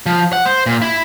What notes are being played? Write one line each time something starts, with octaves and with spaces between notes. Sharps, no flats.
F3
F#5
C5
A#2
E4